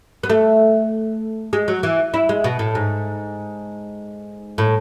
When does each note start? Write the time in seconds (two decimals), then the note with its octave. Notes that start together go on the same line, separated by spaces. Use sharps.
0.23 B3
0.30 A3
1.53 G#3
1.68 F#3
1.83 E3
2.14 E4
2.29 G#3
2.44 B2
2.59 A2
2.75 G#2
4.58 A2